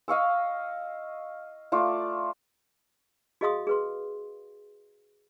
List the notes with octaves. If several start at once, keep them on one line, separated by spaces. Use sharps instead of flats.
D#5 F5 C#6 E6
A3 F4 D5
F#4 G#4 D#5 F5 C6 D#6
G#4 B4 C6